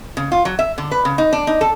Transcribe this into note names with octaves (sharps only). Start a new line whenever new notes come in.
C#3
F4
F#3
E5
D3
B4
C#3
D#4
D4
D#4
A4